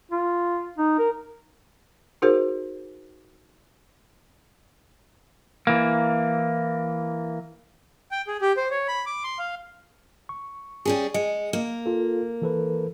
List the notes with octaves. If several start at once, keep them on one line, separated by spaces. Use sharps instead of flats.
F4
D#4
A#4
D#4 F#4 G#4 A#4 C5
E3 A#3
G5
G#4
G4
C5
C#5
B5
D6
C6
F5
C#6
G3 C#4 G#4
G#3 D#5 C#7
A#3
F4 A4
E3 A4 B4